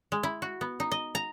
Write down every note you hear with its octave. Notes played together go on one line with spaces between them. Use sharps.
G#3
E4
F#4
B3
D#4
D#5
A#5